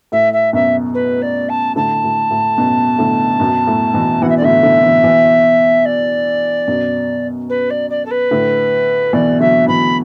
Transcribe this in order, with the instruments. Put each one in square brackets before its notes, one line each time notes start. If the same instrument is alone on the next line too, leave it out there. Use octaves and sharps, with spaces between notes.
[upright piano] A2 [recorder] E5
[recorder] E5
[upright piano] F#2 B2 [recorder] E5
[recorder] B4
D5
A5
[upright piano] A2 D3 [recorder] A5
[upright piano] A2
A2
F#2 B2
A2 D3
F#2 B2
A2
B2 E3
[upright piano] B2 E3 [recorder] F#5
[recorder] E5
D5
[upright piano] A2 D3 [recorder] E5
[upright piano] A2 D3
B2 E3
B2 E3
[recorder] D5
[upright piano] F#2 B2
[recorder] B4
D5
D5
A4
B4
[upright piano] A2 D3
[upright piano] B2 E3 [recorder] D5
[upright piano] D3 F#3 [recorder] E5
[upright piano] B2 E3 [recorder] B5